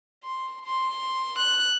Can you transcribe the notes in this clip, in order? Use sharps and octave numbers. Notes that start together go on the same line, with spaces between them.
C6
C6
F#6